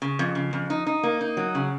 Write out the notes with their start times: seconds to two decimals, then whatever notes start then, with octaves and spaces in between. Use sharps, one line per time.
0.02 C#3
0.19 F2
0.35 C#3
0.53 F2
0.70 D#4
0.87 D#4
1.03 A#3
1.21 D#4
1.37 F#3
1.55 C#3